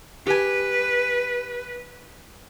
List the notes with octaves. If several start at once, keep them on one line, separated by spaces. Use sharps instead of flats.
G4 B4 G#5